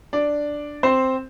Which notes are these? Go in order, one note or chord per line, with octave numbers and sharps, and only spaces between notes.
D4 D5
C4 C5